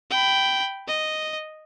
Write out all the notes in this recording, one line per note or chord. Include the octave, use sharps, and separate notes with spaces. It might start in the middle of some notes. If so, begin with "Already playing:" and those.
G5 B5
D#5